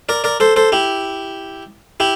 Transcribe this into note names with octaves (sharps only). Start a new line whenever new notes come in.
A#4 D5
A#4 D5
A4 C5
A4 C5
E4 G4
E4 G4